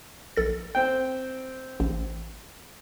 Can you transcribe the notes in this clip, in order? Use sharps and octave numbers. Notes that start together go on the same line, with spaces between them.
A#1 A4 A6
C4 G5
A1